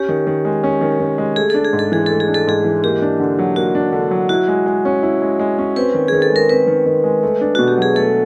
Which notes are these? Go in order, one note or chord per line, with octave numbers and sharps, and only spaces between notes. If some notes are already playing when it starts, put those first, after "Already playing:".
Already playing: C#4 G4
D#3
D#3
G#3
C#4
D#3
D#3
G#3
A3 G#4
D4 A4
G#4
G#2
A4
E3 G#4
A3 A4
G#4
D4
A4
G#2 G#4
E3
A#3 G4
D4
D3
F#3
A#3 F#4
D4
D3
F#3
E4 F#4
G#3
G#3
C#4
E4
G#3
G#3
C#4
C4 B4
D#3
D#3 G#4
A4
G#3 A#4
C4 B4
D#3
D#3
G#3
A3
D4
B2 F#4
G4
F#3 G#4
A3 A4